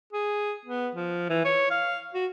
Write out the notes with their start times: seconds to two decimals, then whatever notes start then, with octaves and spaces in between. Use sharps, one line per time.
0.13 G#4
0.65 B3
0.95 F3
1.29 E3
1.45 C#5
1.71 F5
2.14 F#4